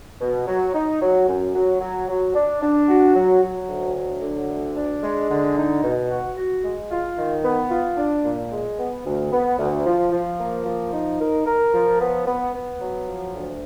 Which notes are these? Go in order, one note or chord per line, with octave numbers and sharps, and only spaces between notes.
B2
F#3
D#4
F#3
F#2
F#3
F#3
F#3
D4
D4
F#4
F#3
F#3
D2
F#3
D3
D2
D4
G#3
D3
D#4
B2
F#4
F#4
G#3
F4
D#3
B3
F4
D4
A#2
G#3
B3
D2
B3
D2
F3
F3
A#3
F3
D#4
A#4
A#4
F3
B3
B3
B3
F#3
F3
D2